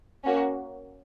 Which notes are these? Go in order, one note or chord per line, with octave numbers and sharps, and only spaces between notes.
A#3 C#4 F#4